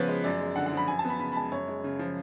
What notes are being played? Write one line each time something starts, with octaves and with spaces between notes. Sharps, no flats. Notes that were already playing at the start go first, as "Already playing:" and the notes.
Already playing: C#3 F3 B3 B4 C#5
G#3
F#2 D5
G#3
D3 F#5
F#5
F3 B5
F#2 G#5
A5
B3 B5
C#3 B5
B5
G#3 A5
F#2 C#5
G#3
C#3
F3